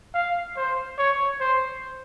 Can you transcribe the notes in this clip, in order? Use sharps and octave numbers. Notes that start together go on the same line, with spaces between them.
F5
C5
C#5
C5